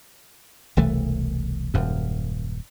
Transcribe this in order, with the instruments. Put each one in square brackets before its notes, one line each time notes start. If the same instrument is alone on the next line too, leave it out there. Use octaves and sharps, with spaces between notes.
[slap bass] E1 C2 E3 A3
D#1 F#2